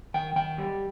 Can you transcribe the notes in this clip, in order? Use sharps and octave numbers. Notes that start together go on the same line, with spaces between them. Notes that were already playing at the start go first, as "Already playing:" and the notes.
D#3 G5
D#3 G5
G3